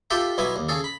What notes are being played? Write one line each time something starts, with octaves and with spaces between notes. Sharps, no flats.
F4 G4 A4 E5 G5
B1 B2 B3 E4 G#5
D#2
C#3 G#4 A4
B5